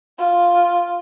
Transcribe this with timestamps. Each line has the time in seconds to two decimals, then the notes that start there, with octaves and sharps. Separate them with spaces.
0.19 F4